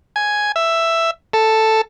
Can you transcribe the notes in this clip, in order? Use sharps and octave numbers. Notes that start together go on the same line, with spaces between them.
G#5
E5
A4